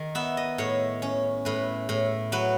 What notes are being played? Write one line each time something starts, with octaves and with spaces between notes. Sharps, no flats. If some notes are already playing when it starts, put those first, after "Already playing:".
Already playing: D#3
B3 E5
D#5
A2 C#5
C#4
A2 B4
A2
F#3 B4